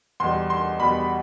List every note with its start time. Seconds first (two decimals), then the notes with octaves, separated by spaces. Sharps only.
0.20 E2 B2 G3 C6
0.50 C6
0.80 E2 B2 G3 B5